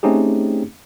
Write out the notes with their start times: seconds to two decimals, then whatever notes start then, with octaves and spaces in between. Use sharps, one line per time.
0.03 A3 C4 C#4 D#4 G4 G#4